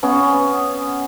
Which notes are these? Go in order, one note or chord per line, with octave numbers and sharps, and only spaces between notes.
B3 C#4